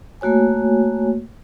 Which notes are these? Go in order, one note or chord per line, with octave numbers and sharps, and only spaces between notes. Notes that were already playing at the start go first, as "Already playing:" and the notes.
A3 A#3 F#4 C#5 G#5